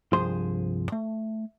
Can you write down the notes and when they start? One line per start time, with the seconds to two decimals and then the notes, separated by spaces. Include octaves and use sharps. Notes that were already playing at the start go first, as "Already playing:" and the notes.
0.13 C2 G2 F3 G#4 C5 C6
0.92 A3